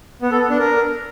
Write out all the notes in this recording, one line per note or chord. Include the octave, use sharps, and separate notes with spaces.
B3
A4
B3
D4
A#4